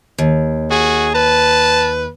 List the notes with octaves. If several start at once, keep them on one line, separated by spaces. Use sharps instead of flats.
D#2
F#4 G#4
B4 A5